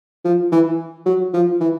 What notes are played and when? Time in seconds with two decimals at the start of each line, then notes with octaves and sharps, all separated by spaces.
0.25 F3
0.52 E3
1.06 F#3
1.34 F3
1.60 E3